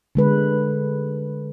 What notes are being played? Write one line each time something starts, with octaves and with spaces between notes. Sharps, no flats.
D3 G#3 B4